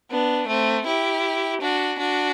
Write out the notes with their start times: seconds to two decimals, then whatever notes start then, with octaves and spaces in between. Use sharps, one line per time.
0.11 B3 D4
0.48 A3 C4
0.86 E4 G4
1.62 D4 F#4
2.00 D4 F#4